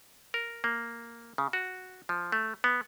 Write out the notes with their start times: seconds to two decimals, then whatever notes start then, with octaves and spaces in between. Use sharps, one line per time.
0.34 A#4
0.64 A#3
1.38 C#3
1.53 F#4
2.09 F3
2.32 A3
2.64 B3